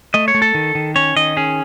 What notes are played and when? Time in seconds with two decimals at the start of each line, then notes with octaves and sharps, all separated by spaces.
0.14 A3 D#5
0.28 C#5
0.34 A3
0.42 A4
0.55 D#3
0.75 D#3
0.96 C#4 C#5
1.16 D#3 D#5
1.37 C#4 G#4